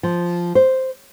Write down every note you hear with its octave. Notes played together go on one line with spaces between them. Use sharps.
F3
C5